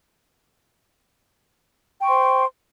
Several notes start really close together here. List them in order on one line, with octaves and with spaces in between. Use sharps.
G5 C#6 C6 C5